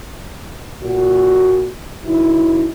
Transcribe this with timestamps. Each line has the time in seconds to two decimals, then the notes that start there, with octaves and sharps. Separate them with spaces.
0.82 A#2 F#4
2.05 F#2 C#3 D#4 E4